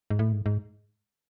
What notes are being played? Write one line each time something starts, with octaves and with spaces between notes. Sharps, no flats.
G#2
A2
G#2
G#2